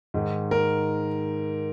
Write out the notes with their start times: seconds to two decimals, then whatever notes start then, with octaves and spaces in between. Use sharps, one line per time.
0.14 G#2 D#3
0.51 A#4